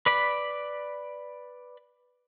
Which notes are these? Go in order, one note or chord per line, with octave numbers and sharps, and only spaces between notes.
B4 D5 B5